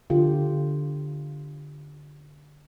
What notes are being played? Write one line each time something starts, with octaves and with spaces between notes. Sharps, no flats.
D3 F4 G4